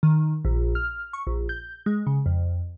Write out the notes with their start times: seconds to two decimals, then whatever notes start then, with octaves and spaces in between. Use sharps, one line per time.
0.03 D#3
0.45 A#1
0.75 F6
1.13 C#6
1.27 A#1
1.49 G6
1.86 G#3
2.07 C#3
2.26 F2